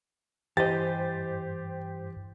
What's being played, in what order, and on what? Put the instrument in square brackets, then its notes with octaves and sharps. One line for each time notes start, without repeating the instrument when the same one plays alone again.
[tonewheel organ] G2 [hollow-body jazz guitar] E3 D#5 [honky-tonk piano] G4 C5 [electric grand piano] A6